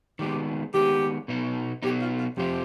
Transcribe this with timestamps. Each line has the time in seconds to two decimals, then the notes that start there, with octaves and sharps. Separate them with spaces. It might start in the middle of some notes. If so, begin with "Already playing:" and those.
0.19 D#3 G#3 B3 G4
0.74 D#3 G#3 B3 G4
1.28 B2 B3 D#4
1.83 B2 B3 D#4 G4
2.01 F4
2.19 F4
2.37 F2 C3 F3 C4 F4 G4